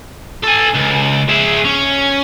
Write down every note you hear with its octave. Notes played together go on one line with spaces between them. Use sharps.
A4 G#5
C#2
G#4 E5
C#4